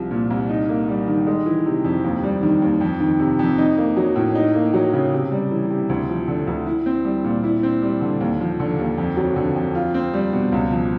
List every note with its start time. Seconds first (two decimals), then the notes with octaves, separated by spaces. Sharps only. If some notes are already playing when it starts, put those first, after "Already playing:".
Already playing: C2 F3
0.11 A#2
0.30 C2
0.49 D#4
0.69 A#3
0.88 G3
1.07 D#3
1.27 G#3
1.46 E3
1.66 C3
1.84 F2
2.04 D#2
2.23 G3
2.43 D#3
2.62 D#2
2.81 F2
3.00 D#3
3.19 C3
3.39 F2
3.58 D#4
3.77 A#3
3.97 F#3
4.16 A2
4.35 D#4
4.55 A#3
4.74 F#3
4.93 C#3
5.12 C3
5.31 G3
5.51 E3
5.70 C3
5.89 D2
6.09 F3
6.28 D3
6.47 D2
6.66 E4
6.86 C4
7.05 G3
7.24 A#2
7.44 E4
7.63 C4
7.82 G3
8.01 D3
8.21 D#2
8.40 F3
8.60 D3
8.79 D#2
8.98 F2
9.17 F#3
9.36 D3
9.56 F2
9.75 F4
9.94 C4
10.13 G3
10.33 B2
10.52 C#2
10.71 F3